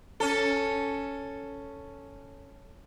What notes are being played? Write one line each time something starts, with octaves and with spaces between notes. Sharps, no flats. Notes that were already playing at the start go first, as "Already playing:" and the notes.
C#4 A4